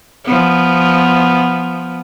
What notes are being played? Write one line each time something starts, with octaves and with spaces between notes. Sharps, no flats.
F3 B3